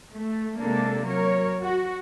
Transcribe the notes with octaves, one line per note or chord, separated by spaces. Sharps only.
A3
C3 G#3 A#3 D4 A4
F#3 A#4 C#5
F#4